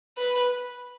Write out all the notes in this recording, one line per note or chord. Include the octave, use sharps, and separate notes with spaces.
B4